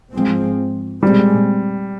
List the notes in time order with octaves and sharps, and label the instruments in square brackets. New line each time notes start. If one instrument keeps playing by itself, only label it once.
[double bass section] G#2 F3 G#3 C4
[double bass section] A#2 G#3 C4 [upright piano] G3